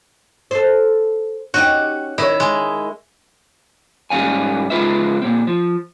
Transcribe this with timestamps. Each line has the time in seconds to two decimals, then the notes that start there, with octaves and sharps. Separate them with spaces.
0.51 A4 C5
1.54 C#4 D#4 F#4 G4
2.18 D#3 E4 C#5 D#5
2.40 G#3
4.10 G#2 G3 C#4 F5 G#5
4.70 C#3 G#3 B3 F4 B4 E5
5.22 A#2 C4
5.47 F3